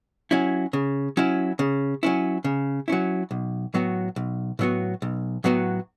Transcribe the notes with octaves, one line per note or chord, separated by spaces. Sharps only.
F#3 C#4 E4
C#3
F#3 C#4 E4
C#3
F#3 C#4 E4
C#3
F#3 C#4 E4
B1
A2 F#3 B3 F#4
B1
A2 F#3 B3 F#4
B1
A2 F#3 B3 F#4